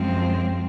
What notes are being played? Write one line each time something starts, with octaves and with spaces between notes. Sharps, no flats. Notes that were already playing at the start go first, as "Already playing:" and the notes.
Already playing: F#2 F3 G#3 C4